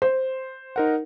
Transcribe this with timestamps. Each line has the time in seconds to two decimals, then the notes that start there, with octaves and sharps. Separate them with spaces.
0.02 C5
0.76 D#4 A#4 F#5